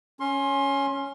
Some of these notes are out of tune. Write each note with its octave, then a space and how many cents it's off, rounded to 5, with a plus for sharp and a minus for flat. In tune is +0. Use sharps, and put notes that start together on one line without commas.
C#4 +0 C6 +25